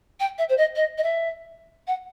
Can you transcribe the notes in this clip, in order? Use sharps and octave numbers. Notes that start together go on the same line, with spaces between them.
G5
E5
C5
D#5
D#5
D#5
E5
F#5